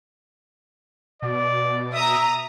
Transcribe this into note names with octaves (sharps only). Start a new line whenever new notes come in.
B2 D5
E5 A#5 D#6